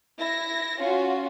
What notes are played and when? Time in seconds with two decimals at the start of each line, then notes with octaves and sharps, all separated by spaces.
0.18 E4 A#6
0.78 C#4 F4 F#4